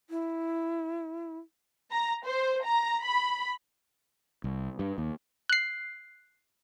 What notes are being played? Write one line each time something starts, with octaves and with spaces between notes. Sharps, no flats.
E4
A#5
C5
A#5
B5
C2
G2
D#2
F#6 C7